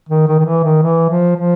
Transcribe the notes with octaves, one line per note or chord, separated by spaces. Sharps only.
D#3
D#3
D#3
E3
D#3
E3
F3
F3